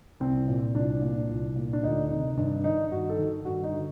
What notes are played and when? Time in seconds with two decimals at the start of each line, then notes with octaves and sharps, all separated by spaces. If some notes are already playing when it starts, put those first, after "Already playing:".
0.20 C2 C4
0.48 A#2
0.74 C2 D4
1.02 A#2
1.29 C2
1.56 A#2
1.73 D4
1.83 D2 D#4
2.10 C3 D#3 D#4
2.37 G2 D4
2.64 D#3 D#4
2.91 G2 F#4
3.09 A4
3.19 D#3
3.45 G2 F#4
3.64 D#4
3.73 D3